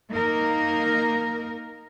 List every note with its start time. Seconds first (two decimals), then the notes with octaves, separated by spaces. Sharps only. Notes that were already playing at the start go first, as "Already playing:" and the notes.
0.12 A#3 D#4 A#4